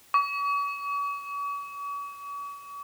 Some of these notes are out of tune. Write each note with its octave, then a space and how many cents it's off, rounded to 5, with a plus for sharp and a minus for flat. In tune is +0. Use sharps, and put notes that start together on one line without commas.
C#6 +45